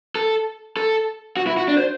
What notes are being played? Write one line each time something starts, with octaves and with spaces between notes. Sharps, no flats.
A4
A4
F#4
E4
F#4
D4
C5